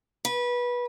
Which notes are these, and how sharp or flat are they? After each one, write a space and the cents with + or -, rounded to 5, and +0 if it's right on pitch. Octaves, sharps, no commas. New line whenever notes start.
B4 -20